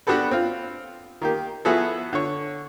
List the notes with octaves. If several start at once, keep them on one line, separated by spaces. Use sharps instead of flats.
B3 D4 F#4 G4 A4 B4
C4 F4
D#3 A#3 G4
F3 B3 E4 F#4 G#4 A4
D3 C#5